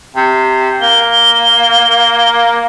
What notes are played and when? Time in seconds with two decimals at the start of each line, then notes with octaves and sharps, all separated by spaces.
0.16 C3
0.82 A#3 G7